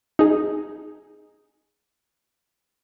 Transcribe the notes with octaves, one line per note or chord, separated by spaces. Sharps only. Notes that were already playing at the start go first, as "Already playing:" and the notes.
D#4 G#4